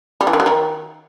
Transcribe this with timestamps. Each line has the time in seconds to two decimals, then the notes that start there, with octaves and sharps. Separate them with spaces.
0.21 G3
0.27 E3
0.33 D#3
0.40 F#3
0.46 D#3